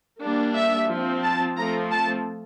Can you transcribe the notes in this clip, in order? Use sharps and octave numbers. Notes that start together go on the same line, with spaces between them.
G3 A#3 D4
E5
F3 C4
A5
F3 A3 C4 A#5
A5